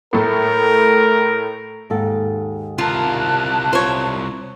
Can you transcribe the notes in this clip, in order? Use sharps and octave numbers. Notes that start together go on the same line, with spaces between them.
A2 A3 A#4
D#2 G#2 A4
C2 F4 A#4 A5 F#6
F4 C5 C#5